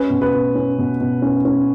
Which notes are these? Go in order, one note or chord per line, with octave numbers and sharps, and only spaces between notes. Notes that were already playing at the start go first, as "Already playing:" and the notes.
Already playing: C#4 B4
B2
B4
B2
C#4
B2
B2
C#4
C#4